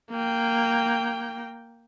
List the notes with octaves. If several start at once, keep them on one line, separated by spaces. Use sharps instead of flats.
A#3 G5